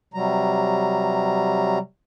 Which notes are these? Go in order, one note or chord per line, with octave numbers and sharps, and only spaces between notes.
C3 F#3 G3 A#5